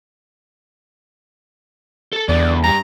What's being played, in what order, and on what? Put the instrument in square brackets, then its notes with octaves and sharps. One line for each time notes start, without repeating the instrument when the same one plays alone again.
[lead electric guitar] A4 A5
[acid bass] E2 [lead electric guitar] D3 B3 [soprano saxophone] D5
[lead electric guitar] G2 [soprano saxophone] A#5